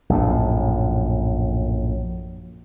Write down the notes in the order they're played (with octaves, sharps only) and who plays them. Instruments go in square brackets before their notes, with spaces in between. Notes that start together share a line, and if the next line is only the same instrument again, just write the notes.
[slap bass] A#1 F#2 A2